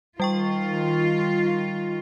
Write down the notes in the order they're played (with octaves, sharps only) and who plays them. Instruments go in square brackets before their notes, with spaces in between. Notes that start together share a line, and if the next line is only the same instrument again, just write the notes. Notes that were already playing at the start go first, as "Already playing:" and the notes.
[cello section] D#3 F4 [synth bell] G3 G5 C#6